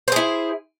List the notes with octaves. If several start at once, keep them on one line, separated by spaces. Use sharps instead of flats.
E4 G#4 C5